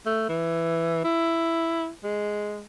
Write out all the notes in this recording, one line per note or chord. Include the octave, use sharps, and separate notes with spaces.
A3
E3
E4
G#3